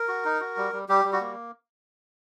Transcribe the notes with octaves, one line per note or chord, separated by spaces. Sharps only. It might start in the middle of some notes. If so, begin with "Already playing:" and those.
Already playing: A#4
F#4
D#4
F#4
G3
G3
G3 G4
G3
F#4
A#3